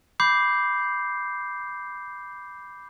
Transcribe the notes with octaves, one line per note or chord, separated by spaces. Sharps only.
B5 D6 G6 C7